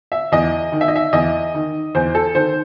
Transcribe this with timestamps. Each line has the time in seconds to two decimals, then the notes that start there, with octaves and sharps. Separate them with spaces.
0.12 E5
0.32 E2 D#5
0.72 D#3
0.81 E5
0.88 D#5
0.96 E5
1.13 E2 D#5
1.54 D#3
1.95 E2 C5
2.15 A4
2.35 D#3 C5